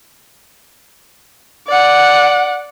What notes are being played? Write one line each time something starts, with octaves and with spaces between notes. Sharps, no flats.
D5 F#5